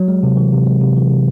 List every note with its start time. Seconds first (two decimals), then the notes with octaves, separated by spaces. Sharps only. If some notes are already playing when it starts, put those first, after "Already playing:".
Already playing: F#3
0.08 G#3
0.23 C3
0.37 E3
0.53 C3
0.66 G#3
0.81 C3
0.96 E3
1.10 C3